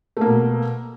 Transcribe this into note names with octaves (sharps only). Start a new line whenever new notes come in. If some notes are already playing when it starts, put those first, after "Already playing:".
B2 A3 A#3